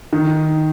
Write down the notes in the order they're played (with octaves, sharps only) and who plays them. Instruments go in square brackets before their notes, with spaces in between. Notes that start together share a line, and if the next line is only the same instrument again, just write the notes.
[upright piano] D#3